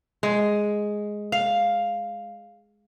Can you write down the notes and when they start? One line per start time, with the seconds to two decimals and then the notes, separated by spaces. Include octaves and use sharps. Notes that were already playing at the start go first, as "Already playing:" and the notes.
0.23 G#3
1.32 F5